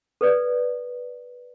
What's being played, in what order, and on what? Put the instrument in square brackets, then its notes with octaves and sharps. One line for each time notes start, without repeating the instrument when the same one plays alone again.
[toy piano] A4 B4 D5